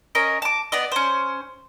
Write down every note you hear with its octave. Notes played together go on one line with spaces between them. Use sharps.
C#4 A#4 C#5 D#5
A5 D6
B3 D5 D#5
C#4 C5